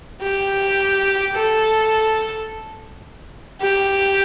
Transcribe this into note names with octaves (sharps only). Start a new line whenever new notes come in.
G4
A4
G4